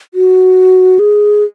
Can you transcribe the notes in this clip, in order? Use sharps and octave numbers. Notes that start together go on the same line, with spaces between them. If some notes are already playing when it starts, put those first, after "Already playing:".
F#4
G#4